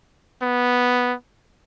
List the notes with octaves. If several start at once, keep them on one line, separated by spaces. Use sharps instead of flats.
B3